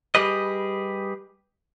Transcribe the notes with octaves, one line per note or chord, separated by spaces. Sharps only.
G3 G4 G#4 B4 D#5